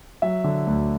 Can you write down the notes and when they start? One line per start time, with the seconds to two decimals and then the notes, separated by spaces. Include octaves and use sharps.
0.22 F#3 E5
0.44 D3
0.67 D2